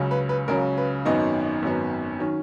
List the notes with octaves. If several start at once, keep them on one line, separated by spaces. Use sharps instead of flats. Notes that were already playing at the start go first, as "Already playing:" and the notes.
Already playing: C#2 C#3 F#3 C#4
B4
B4
C#2 C#3 F#3 C#4 A#4
B4
G#1 F#2 D#3 F#3 B3 D#5
G#1 F#2 D#3 F#3 B3
D#3 F#3 C#4